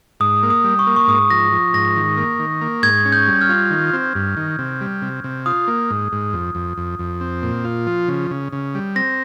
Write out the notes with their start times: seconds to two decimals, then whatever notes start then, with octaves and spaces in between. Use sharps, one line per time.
0.20 G#2 D#6
0.43 A#3
0.50 D#6
0.64 G3
0.79 C#6
0.87 A#3
0.96 C#6
1.08 G#2 D#6
1.30 F3 A#6
1.52 F3
1.73 G#2 A#6
1.96 D#3
2.17 A#3
2.39 D#3
2.61 A#3
2.83 G#2 G#6
3.05 C#4
3.12 G6
3.27 G3
3.41 F6
3.49 F4
3.70 D#3
3.93 C4
4.15 G2
4.37 D#3
4.59 C3
4.81 G3
5.02 C3
5.24 C3
5.46 F4 D#6
5.68 A#3
5.90 G#2
6.12 G#2
6.33 F2
6.55 F2
6.77 F2
6.99 F2
7.21 C4
7.42 A#2
7.64 F4
7.87 F3
8.08 C#3
8.31 C#3
8.52 C#3
8.75 G3
8.96 C4 A#6